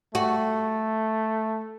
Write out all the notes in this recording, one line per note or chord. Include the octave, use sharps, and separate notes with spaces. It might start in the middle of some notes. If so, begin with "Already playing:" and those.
A3 F#4